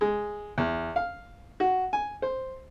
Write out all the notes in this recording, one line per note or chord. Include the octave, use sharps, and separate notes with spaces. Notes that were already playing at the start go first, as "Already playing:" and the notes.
G#3
E2
F5
F#4
G#5
C5